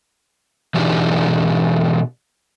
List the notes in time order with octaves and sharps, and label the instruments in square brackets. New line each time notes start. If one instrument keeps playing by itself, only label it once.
[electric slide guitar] B2 E3 D4 D#4 G4 G#4